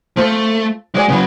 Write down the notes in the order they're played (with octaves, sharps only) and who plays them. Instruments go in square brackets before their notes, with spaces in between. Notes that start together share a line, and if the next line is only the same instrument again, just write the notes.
[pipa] F3 C4 A4 [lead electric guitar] A3
[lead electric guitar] G#3 [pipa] F#4 D5 G#5
[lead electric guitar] C#3 F#3 [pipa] B3 E4